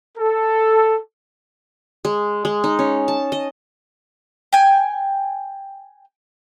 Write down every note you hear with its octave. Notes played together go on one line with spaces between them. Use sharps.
A4
G#3
G#3
D#4
C#4
A5
D#5
G5 G#5